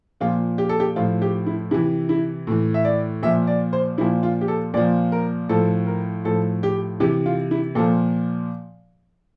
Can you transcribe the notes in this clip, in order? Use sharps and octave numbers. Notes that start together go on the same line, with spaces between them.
A#2 F3 F4
G4
A4
G4
A2 F3 F4
G4
E4
C3 E3 E4
E4
A2 E3
E5
D5
A#2 F3 E5
D5
C5
A#2 F3 E4
F4
G4
A4
A#2 F3 D5
A#4
A2 F3 A4
A#4
A2 F3 A4
G4
C3 E3 G4
F4
E4
A#2 F3 A4